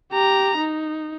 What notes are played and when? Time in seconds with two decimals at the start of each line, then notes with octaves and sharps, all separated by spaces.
0.12 G4 A#5
0.58 D#4